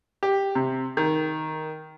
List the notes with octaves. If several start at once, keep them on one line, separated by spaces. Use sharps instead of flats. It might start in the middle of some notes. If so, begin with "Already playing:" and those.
G4
C3
D#3